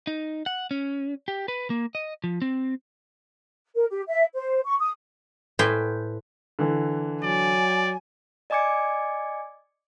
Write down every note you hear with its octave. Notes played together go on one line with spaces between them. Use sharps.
D#4
F#5
C#4
G4
B4
A#3
D#5
F3
C4
A#4
G4
E5
C5
C#6
D#6
A2 B4 C5 G5 G#5
D3 E3
F#3 D5 G#5
D5 D#5 G#5 D6 G#6 C#7